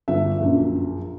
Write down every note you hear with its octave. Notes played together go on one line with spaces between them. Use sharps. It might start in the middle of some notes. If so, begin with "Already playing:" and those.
G1 E5
A#1 F#2